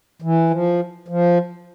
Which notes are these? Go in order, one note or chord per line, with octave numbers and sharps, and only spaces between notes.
E3
F3
F3